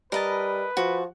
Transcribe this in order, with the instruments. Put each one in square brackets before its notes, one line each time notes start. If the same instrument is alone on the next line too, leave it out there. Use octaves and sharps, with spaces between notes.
[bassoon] G3 [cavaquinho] A#4 D#5 A5 [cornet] B4
[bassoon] F3 [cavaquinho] F#4